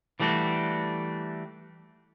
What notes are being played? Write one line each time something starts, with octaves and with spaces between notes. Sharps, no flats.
E3 G3 A3 D4 F#4